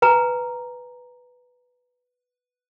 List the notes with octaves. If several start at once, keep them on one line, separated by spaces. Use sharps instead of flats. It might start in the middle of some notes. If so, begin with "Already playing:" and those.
B4 G#5 A#5